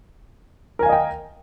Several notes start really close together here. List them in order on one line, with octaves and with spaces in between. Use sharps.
A#4 G#5 F5 D#5 G5